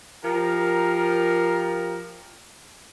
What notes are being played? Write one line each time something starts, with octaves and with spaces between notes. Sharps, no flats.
F3 G4 A#4